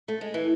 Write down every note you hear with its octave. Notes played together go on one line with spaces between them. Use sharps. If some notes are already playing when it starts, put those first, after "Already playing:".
A3
G#3
E3